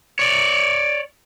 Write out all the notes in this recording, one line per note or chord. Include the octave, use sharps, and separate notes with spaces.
C#5 D5